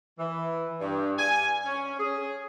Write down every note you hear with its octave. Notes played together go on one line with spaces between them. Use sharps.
E3
G2
G#5
C#4
G#4